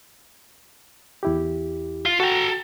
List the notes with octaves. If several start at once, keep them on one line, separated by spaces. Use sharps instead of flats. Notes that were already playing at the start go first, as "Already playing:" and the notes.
E2 E4 G4
F4
F#4 A4 G5 A#5